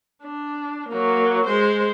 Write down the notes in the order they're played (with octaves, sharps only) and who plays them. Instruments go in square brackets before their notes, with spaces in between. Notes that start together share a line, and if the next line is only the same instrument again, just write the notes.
[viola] D4
F#3 A#3
G#3 C5